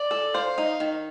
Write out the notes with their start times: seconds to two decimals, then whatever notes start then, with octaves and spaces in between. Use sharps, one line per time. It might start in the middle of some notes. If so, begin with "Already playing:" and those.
Already playing: D5
0.11 A4
0.34 C5 F5
0.58 D#4
0.80 D#3